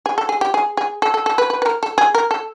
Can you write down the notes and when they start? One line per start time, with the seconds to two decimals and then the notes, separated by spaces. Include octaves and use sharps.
0.06 G#4
0.18 A4
0.29 G#4
0.41 G4
0.54 G#4
0.77 G#4
1.02 A4
1.14 A4
1.26 A4
1.38 B4
1.50 B4
1.62 B4
1.66 A#4
1.83 A4
1.98 G#4
2.15 A#4
2.31 A4